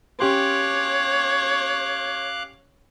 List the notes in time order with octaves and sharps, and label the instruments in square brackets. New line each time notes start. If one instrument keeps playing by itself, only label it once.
[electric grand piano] C#4 G4 C6 [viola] C#5 [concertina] F5 D6 F#6